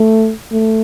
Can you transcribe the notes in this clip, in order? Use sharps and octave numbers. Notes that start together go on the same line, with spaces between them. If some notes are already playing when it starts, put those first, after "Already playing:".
Already playing: A3
A3